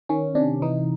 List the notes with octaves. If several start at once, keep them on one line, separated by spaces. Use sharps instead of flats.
D#3 C#4
C3 D4
E3 D#4